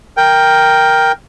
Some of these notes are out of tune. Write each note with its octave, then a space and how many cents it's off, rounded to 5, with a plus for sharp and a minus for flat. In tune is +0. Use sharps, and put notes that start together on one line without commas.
A#4 +0 G5 +5